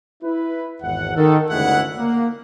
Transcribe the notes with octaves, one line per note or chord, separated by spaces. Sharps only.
E4 B4
G#1 E2 F#5
D#3 A4
G1 D2 C#3 G#3 E4 F#5
A#3